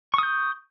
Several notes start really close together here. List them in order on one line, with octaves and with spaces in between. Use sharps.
C#6 D#6 G6